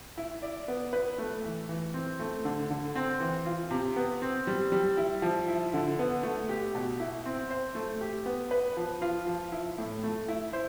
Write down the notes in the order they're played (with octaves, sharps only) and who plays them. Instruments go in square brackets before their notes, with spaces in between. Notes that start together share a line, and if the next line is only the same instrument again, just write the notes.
[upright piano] E4
D5
B3
B4
A3
E3
E3
C4
A3
D3
D3
C4
E3
F4
C3
B3
C4
G3
G3
E4
F3
E4
D3
B3
A3
G4
B2
E4
C4
C5
A3
G4
B3
B4
F3
F4
F3
E4
A2
A3
E4
C5